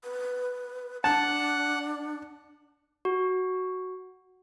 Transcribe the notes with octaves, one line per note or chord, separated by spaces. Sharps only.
B4
D4 F#5 A5 F#6
F#4